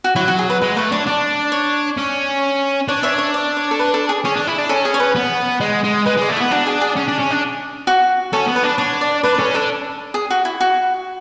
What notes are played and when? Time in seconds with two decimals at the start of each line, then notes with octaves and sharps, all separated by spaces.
0.04 F#4
0.16 F#3 E4
0.28 F#4
0.38 G#4
0.50 B4
0.61 G#3 B4
0.76 A3 B4
0.91 D4 C#5
1.06 D4 D5
1.52 C#5
1.98 C#4
2.88 D4 C#5
3.03 C#5 E5
3.18 C#5 E5
3.34 D5
3.57 C#5
3.71 A4
3.79 B4
3.94 A4
4.09 G#4
4.24 C#4 G#4
4.36 D4
4.47 E4
4.58 D4
4.69 C#4 A4
4.85 G#4
4.94 C#5
5.00 B4
5.15 B3
5.60 G#3
5.84 G#3
6.06 G#3 B4
6.17 G#3 D5
6.29 A3
6.37 B3 E4
6.51 D4 F#4
6.67 G#4
6.81 G#4
6.97 C#4
7.08 D4
7.19 C#4
7.31 D4
7.87 F#4
8.33 C#4 A4
8.48 B3
8.56 B4
8.64 D4
8.78 D4 C#5
9.01 D5
9.23 D4 B4
9.35 B4
9.39 C#4 A4
9.54 D4 A4
10.14 G#4
10.30 F#4
10.45 E4
10.60 F#4